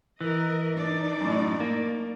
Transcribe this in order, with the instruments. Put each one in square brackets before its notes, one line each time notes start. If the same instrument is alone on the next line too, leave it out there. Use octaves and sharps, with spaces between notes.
[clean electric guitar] E3 [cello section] A#4 D#5
[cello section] D4 D#4 D5
[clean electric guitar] F#2 A2
A#3